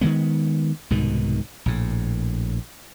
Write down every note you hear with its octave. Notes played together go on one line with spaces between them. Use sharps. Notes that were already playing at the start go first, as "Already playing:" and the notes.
D#3 E3 G#3 B3
C2 G#2 B2 D#3
A#1 A2